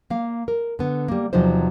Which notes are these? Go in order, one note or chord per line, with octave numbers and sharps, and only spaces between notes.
A#3 F5
A#4
D3 B3
G3 A#3
E2 C3 F3 F#3 D#4 C5